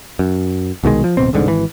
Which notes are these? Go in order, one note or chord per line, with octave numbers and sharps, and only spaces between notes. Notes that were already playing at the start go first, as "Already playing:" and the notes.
F#2
C2 B2 D#3 G#3
F3
D1 B2 C4
E1 C2 G#2 D3
G#1 E3